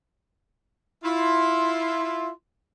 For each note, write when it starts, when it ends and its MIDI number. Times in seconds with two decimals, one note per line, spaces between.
1.04 2.29 64
1.04 2.29 65
1.04 2.29 84